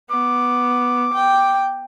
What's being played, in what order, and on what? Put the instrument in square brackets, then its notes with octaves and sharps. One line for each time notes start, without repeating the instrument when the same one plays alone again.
[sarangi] B3 [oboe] D6
[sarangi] G5